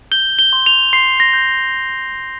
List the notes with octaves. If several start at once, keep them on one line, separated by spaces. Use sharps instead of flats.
G6 G7
G7
C6
F7
C6 C7
A#6
G6